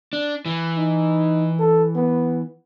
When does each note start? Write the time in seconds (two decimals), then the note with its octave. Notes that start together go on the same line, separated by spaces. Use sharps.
0.13 D4
0.46 E3
0.78 D#4
1.60 A4
1.96 B3